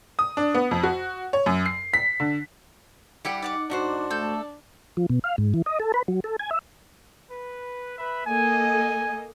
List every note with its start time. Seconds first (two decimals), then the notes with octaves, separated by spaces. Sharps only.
0.19 D#6
0.37 D4
0.54 B3
0.71 F2
0.83 F#4
1.33 C#5
1.46 F#2
1.66 C7
1.94 B6
2.20 D3
3.25 G3 E4 G4 F#5
3.42 D#4 D5 F#5 D6
3.70 G#2 D4 F#4 C5
4.11 A3 A4 G6
4.97 F3
5.09 B2
5.24 F5
5.38 G#2
5.54 E3
5.66 D#5
5.80 A4
5.94 B4
6.08 F#3
6.24 A4
6.39 G#5
6.51 E5
7.30 B4
7.98 B4 E5 B5
8.26 A#3 A4 D#5 G#5